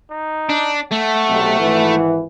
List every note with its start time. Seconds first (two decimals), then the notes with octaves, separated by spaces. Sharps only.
0.11 D#4
0.49 D4
0.92 A3 F#5
1.28 B1 C3
1.59 G#1 E3